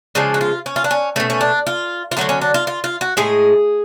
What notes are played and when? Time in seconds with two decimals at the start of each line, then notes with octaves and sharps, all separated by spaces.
0.15 C#3 F3 G#3 D4
0.34 F#4
0.41 F4
0.66 C#4
0.76 F4
0.84 D4
0.91 C#4
1.16 B2 A3 C#4
1.30 C#4
1.41 D4
1.67 F4
2.11 F4
2.17 D3 F#3 A3 D4
2.29 C#4
2.41 D4
2.54 F4
2.67 F4
2.84 F4
3.01 F#4
3.17 A2 G#3 G#4